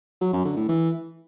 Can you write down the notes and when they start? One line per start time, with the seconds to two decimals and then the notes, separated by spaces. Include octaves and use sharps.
0.21 F#3
0.33 F#2
0.45 D3
0.57 A2
0.68 E3